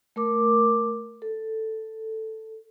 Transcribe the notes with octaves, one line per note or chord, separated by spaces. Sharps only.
A3 A#4 D6
A4